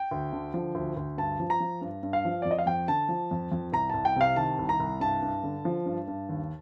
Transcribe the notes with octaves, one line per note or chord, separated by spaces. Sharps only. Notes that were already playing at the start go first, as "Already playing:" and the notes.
Already playing: G5
D2
D3
F3
D2
D2
G2 A5
F3
A#5
F3
G2
G2
F5
F3
D5
F2
D#5
F5
F2 G5
D3 A5
F3
F2
F2
C2 A#5
C2 A5
G5
C3 F5
D#3 A5
C2
A#5
C2
G2 A5
G2
D3
F3
G2
G2
D#2